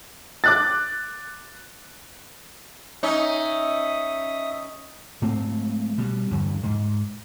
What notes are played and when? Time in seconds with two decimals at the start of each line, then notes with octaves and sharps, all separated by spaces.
0.44 D6 F#6 A6
3.03 C#4 D#4 E5 D#6
5.22 G#2 A3 C4
5.98 B2 G3
6.31 E2 G2 D3
6.63 G#2